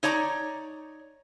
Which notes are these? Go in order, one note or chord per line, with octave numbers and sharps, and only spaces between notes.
D#4 C#5 D5 A#5